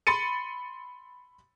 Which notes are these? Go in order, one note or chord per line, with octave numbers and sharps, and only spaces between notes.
B5 C6 A6 C#7 D#7